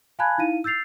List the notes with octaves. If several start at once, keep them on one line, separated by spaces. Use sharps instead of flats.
F5 G#5 A5 B5 F#6 G#6
D#4 E4 F5 D#7
E6 G6 A6 C7 F7